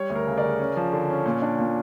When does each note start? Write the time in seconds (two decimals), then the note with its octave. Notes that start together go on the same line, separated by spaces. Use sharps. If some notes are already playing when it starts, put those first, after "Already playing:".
Already playing: G3 C#5
0.10 D2
0.16 A#4
0.27 C#3
0.37 A#4 D5
0.43 C#3
0.59 C#4
0.77 F3
0.93 D3
1.09 C#4
1.26 A#2
1.42 D4
1.59 A#2